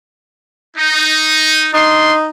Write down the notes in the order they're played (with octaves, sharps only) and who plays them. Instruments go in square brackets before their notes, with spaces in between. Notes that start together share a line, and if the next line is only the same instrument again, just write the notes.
[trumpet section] D#4
[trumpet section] D4 C6 [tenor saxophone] D#4